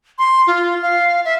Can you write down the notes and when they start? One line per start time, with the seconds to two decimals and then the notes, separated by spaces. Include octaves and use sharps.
0.18 C6
0.47 F4
0.82 F5
1.25 E5